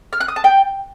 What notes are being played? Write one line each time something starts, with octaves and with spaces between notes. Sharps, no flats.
F6
F#6
D#6
A5
G5